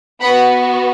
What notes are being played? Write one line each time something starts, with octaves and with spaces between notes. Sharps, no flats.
B3 F#4 F#5 B5